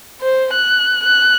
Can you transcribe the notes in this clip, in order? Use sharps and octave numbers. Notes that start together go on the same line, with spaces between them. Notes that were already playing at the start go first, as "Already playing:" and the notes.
C5
F#6
F#6